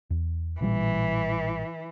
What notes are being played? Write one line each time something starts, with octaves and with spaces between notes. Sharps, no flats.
E2
A1 A#2 E3 G3